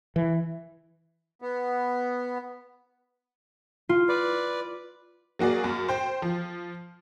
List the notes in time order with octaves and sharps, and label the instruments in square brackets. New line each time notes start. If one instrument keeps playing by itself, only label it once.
[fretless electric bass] E3
[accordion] B3
[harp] F4
[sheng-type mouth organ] B4 D5
[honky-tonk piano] F#3 A#3 F#4 G#4 D5
F#2
C5 G5
F3